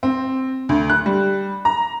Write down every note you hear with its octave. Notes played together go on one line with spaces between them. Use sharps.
C4
D2
F#6
G3
A#5